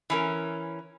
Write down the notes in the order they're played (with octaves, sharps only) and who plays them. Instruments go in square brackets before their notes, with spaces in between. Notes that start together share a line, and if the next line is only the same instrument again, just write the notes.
[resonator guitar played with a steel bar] E3 C#4 A#4